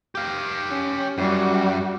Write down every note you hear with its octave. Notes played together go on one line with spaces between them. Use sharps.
G4 F5
C#4
F#2 G3 F#4